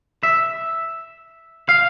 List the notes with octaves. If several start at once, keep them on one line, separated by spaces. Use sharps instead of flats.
E5
F5